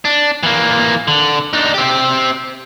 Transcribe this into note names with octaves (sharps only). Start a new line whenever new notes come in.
D4
E3 A#3
D3
D4 D#4
C4 G4